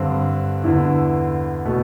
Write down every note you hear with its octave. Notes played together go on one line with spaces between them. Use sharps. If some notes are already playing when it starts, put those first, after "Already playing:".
Already playing: G2 D3 C4
E2 D3 E4
B2 A3